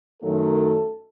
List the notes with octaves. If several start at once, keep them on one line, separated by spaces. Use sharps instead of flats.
F#2 D#3 F#3 A3 A4